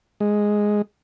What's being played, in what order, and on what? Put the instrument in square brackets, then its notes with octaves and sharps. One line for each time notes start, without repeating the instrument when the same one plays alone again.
[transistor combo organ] G#3